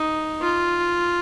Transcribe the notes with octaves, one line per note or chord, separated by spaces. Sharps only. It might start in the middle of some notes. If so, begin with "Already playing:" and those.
Already playing: D#4
F4